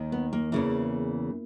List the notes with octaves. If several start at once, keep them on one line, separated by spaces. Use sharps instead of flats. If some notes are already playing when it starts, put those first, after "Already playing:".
Already playing: D#2 D#3
B3
A#3
E2 C#3 E3